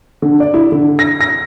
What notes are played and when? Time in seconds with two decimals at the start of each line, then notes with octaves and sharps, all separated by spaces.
0.22 D3
0.40 D5
0.54 E4
0.72 D3
0.99 A#6
1.21 A#6